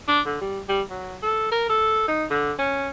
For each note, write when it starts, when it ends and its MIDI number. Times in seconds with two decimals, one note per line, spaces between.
0.08 0.21 62
0.26 0.37 50
0.41 0.60 55
0.69 0.82 55
0.90 1.17 54
1.22 1.48 69
1.52 1.67 70
1.70 2.05 69
2.08 2.25 63
2.30 2.53 50
2.59 2.90 61